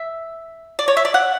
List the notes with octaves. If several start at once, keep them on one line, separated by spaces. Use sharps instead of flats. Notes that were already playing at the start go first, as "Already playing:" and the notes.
Already playing: E5
D5
C#5
E5
D5
F#5